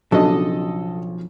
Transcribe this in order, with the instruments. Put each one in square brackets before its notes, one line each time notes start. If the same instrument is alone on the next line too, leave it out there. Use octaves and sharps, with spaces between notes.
[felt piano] B1 C#3 [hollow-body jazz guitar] F3 [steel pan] F#3 D4 [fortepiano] A4 D#5